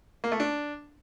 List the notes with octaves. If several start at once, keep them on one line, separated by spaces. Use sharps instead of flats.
A#3
A3
D4